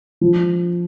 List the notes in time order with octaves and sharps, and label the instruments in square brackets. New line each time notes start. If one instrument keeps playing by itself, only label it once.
[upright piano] F3